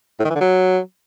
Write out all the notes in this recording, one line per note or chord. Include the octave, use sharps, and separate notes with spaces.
A2
D#3
E3
D3
F#3